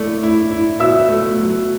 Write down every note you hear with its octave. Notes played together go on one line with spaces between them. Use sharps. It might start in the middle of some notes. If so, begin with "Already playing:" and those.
Already playing: A3 E4 D5
E4
E4
B2 E5 E6
A3
F#3